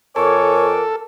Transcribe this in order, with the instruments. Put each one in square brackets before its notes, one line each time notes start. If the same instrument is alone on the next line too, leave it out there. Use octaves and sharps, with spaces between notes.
[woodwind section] F2 G#5 D6 [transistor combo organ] A4 [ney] A#4 [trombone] C#5